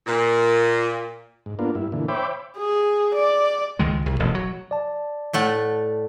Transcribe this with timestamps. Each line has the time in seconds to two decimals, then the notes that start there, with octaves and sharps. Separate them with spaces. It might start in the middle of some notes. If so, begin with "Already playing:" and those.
0.07 A#2
1.46 G#2
1.59 A#3 B3 D4 F4
1.75 G2 E4
1.92 A#2 D3 E3
2.08 C5 C#5 E5 G5 B5 D6
2.58 G#4
3.14 D5
3.79 C#2 D#3 G#3
4.06 C2
4.19 E1 A1 B2
4.35 F#3
4.71 D5 A5
5.33 A2 A3 F#5